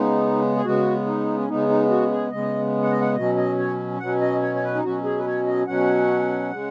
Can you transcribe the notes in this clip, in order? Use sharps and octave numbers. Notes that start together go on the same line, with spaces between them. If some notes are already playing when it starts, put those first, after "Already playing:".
Already playing: C#3 G#3 B3 D#4
G#4
C#3 G#3 B3 F#4
D#4
C#4
C#3 G#3 B3 D#4
D#4
F#4
G#4
C#3 G#3 B3 D#5
F#5
D#5
F#5
B2 F#3 C#4 D#5
D#5
C#5
B2 F#3 C#4 F#5
D#5
C#5
C#5
B4
D#4
B2 F#3 C#4 F#4
G#4
B4
C#5
D#5
B2 F#3 C#4 F#5
C#3 G#3